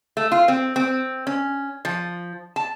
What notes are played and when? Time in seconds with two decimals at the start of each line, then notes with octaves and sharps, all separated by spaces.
0.17 A3
0.32 F4
0.48 C4
0.76 C4
1.27 C#4
1.85 F3
2.56 A5